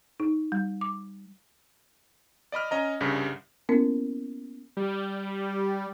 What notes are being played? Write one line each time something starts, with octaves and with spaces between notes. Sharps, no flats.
D#4
G3
D6
D5 D#5 B5 F6
C#4 D#5 A#5
C2 G2 C#3
A#3 B3 C#4 E4 A#4
G3